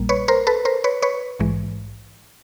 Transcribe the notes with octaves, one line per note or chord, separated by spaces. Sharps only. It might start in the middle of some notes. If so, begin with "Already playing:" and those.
Already playing: A#1 A#2 G3 A#3
B4 C#5
A#4 C5
A4 B4
A#4 C5
B4 C#5
B4 C#5
A#1 G#2 E3 G#3